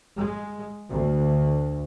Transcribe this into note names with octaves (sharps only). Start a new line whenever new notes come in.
G#3
D2